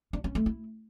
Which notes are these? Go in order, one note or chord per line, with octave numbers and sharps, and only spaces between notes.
D4
C#4
A3
E4